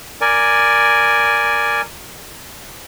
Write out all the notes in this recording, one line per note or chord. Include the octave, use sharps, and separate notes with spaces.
A#4 D5 G#5